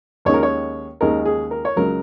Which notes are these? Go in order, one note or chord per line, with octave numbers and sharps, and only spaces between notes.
D#2 D#3 G#3 C#4 C#5
A#4
C#5
D#2 D#3 G#3 C#4 A#4
G#4
A#4
C#5
C#2 C#3 F#3 A#4